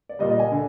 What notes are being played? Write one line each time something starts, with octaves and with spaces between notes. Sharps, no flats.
D5
A#2 G3 D#5
D#5
G#5
D3